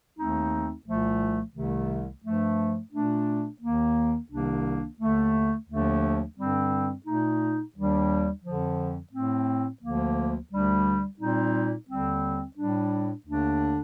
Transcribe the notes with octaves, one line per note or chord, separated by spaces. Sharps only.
D#2 D#3 A3 C4 D#4
C2 A#2 F3 A3
C2 C3 D#3 A3
G2 F3 A3
A#2 A3 D4
D#2 D#3 A#3
C2 C3 D#3 A#3 D4
D#2 D3 A3
D#2 D3 F3 A3 D4
G2 D3 G3 C4
A#2 A3 D#4
D#2 D#3 G3 D4
F2 D3 F3
A2 A3 C4
D2 D3 F3 A#3
D2 D3 G3 D4
A#2 G3 C4 D#4
D#2 D3 G3 C4
A2 G3 D4
D#2 D3 A3 D4